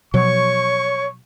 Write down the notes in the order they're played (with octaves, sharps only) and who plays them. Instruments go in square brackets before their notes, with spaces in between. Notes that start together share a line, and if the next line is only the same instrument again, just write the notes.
[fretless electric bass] B2 F3 F#3 [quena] C#5 [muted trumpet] C#6